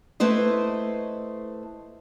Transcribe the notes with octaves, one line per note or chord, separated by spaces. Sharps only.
A3 E4 B4 C5 D#5